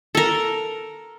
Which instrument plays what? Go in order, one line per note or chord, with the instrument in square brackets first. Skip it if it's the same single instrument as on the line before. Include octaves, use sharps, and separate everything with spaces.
[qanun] A4 A#4